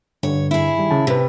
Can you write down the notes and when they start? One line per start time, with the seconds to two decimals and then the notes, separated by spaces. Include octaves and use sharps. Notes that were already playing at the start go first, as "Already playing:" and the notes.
0.23 G2 D3 C#5
0.51 E4 G#4
0.78 D#3 G3
0.91 C#3 A5
1.07 C3 G4 B4